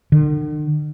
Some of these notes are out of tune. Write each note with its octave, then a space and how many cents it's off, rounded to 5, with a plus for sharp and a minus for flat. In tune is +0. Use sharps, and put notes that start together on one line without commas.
D3 +45